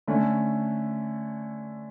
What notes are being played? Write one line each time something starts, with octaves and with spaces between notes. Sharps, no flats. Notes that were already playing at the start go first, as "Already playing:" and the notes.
D3 A3 C#4